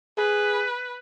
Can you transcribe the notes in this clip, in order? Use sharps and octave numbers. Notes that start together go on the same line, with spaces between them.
G#4 B4